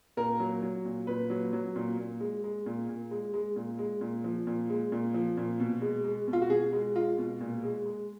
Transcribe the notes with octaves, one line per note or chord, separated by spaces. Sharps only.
A#2 A#4
F#3
F#3
A#2
A#2 B4
F#3
F#3
A#2
A#2
G#3
G#3
A#2
A#2
G#3
G#3
A#2
G#3
A#2
F3
A#2
G#3
A#2
F3
A#2
B2
G#3
G#3
B2
F4
F#4
B2 G#4
G#3
G#3 F4
B2
A#2
G#3
G#3